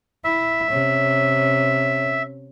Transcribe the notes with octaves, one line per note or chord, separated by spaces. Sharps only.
E4 E5
C3 C#4